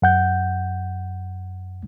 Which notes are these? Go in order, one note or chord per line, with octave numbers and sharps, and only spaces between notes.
F#2 F#5 G6